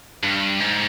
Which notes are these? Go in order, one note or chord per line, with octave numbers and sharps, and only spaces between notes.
G2
G#2